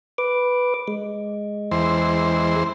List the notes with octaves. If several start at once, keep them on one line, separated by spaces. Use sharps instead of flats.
B4 D6
G#3
E2 C5